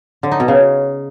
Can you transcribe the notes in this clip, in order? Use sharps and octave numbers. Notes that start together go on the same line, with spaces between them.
D3
D#4
B2
C#3